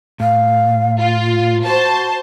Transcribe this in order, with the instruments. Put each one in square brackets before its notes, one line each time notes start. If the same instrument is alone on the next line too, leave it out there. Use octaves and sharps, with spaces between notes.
[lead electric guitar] A2 [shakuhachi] F5
[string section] F4
[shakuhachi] F#4 [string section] C5 A5